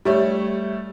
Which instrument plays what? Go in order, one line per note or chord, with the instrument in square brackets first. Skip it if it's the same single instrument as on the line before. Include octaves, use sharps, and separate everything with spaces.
[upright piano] G3 A3 C#5